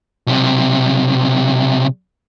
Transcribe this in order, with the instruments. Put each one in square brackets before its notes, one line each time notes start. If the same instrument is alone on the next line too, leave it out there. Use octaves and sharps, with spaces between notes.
[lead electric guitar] B1 C3